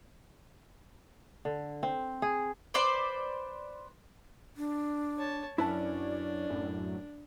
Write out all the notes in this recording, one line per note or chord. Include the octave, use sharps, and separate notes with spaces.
D3
C4
G#4
B4 C5 D5 C6
D4
C#5 A5
F#2 C#4 D4 E4 B4 D5 A5
F#2 A2